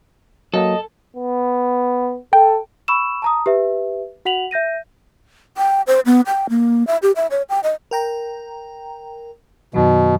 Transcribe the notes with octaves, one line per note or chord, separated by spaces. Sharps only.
F#3 A#3 A4 D#5
B3
A4 G5
B5 C#6 E6 E7
A5 A#5 D#6
G4 B4 E5
F#4 F#5 B6 F7 F#7
E5 G6 A#6 D#7
G5
C5
B3
G5
A#3
E5
G4
E5
C#5
G5
D#5
A#4 G5 A#5
F#2 B2 D#3 F#3